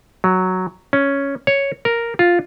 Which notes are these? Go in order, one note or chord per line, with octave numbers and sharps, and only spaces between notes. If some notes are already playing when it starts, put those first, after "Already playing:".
F#3
C#4
C#5
A#4
F4